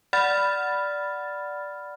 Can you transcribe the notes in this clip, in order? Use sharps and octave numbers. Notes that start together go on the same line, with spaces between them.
D5 F#5 B5 F6 A6